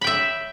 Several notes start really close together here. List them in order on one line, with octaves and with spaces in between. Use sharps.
B5 G5 E5